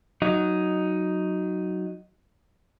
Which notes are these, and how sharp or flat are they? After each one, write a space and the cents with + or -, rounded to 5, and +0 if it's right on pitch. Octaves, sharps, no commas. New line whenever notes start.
F#3 +0 D#4 +0